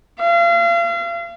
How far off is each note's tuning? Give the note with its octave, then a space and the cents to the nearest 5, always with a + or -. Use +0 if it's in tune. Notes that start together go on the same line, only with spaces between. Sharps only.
F5 -35